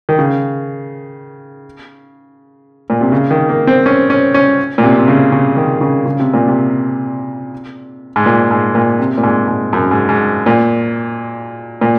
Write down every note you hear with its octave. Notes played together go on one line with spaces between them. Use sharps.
D#3
C#3
A#2
C3
C#3
D#3
A#3
C4
C#4
C#4
C#4
A#2
C3
C3
C#3
C#3
D#3
C#3
C#3
C3
A#2
C3
G#2
A#2
G#2
A#2
C3
A#2
G#2
G#2
F#2
G#2
G#2
A#2
A#2